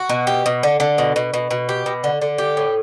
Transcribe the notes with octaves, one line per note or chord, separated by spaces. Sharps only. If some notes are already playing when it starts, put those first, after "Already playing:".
Already playing: F#4
B2
G4
B2
D3
D3
B2
B2
B2
B2
G4
B2
D3
D3
G4
A2